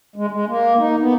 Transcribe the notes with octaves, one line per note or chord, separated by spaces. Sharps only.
G#3
G#3
A#3
D#4
B3